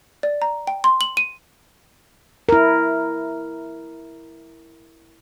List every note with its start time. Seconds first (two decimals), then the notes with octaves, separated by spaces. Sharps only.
0.23 D5
0.42 A#5
0.67 G5
0.84 C6
1.01 F#7
1.17 D#7
2.49 E4 A#4